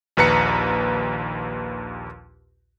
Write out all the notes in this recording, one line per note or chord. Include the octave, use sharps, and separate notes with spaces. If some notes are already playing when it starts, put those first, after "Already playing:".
A#1 D#2 B4 A#5 C#7